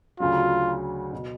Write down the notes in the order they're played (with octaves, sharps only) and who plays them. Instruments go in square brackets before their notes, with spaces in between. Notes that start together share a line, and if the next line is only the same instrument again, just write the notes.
[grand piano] D2 C#3 F#3 [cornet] F4
[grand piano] B2